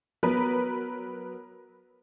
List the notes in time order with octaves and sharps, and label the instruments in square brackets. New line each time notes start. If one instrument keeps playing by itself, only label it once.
[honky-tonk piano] F#3 B3 A#4 B4